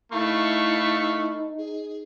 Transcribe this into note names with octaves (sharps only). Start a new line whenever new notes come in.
A3 D#4 E4 F5 B5 C#6
G#4